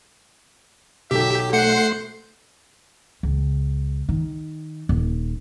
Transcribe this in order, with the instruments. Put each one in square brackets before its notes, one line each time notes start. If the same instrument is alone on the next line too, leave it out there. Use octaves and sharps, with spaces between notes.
[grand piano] B1 F#3 A4 [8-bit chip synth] G4 [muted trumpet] E5
[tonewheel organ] A3 C6 [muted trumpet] C5 [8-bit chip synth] F#5 C#7
[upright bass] C#2
D#3
D#1